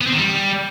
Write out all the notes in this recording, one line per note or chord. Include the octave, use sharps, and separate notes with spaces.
B3
C4
D#3
G3